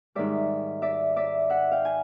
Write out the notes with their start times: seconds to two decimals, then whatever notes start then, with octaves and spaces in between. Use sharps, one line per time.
0.15 G#2 D#3 G3 D5 E5
0.82 D5 E5
1.16 D5 E5
1.50 E5 F#5
1.72 F5 G5
1.85 G#5